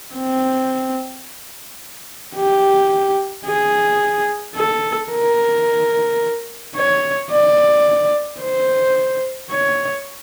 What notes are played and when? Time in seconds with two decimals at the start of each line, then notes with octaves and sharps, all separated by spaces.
0.15 C4
2.36 G4
3.46 G#4
4.56 A4
5.10 A#4
6.75 C#5
7.31 D5
8.40 C5
9.51 C#5